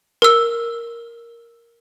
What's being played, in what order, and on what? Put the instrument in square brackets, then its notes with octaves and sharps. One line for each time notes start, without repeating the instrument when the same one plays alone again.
[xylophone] A#4 E6